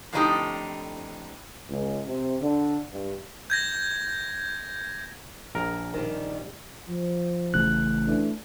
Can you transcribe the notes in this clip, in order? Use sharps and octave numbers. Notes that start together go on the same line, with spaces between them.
F2 A2 D3 D#4 G4 A4
C#2
C3
D3
G2
G6 G#6 A#6
A#1 A#4
D#3 G3
F3
A1 A2 C#3 F#6
E3 A3 D4